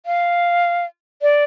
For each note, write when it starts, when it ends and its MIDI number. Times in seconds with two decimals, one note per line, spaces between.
0.06 0.85 77
1.22 1.44 74